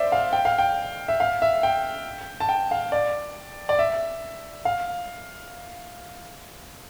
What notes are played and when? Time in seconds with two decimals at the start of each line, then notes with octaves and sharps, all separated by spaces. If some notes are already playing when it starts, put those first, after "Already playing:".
Already playing: C5 D5 E5
0.12 F5
0.33 G5
0.45 F5
0.59 G5
1.08 E5
1.20 F5
1.42 E5
1.63 G5
2.40 A5
2.49 G5
2.71 F5
2.92 D5
3.69 D5
3.79 E5
4.65 F5